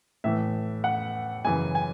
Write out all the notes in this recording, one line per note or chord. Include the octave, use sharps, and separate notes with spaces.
A2 E3 E5
F#5
F#2 C#3 E3 G#5
G#5